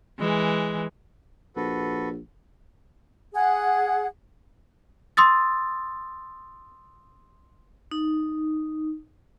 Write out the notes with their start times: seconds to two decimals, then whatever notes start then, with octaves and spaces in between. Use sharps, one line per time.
0.19 E3 G#3
1.56 A#1 F#4 A4 B4
3.35 G#4 F#5
5.17 C6 D#6 E6 A6
7.91 D#4